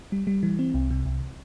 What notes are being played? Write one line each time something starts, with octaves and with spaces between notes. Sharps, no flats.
G3
G3
E3
C4
C2
C3
C2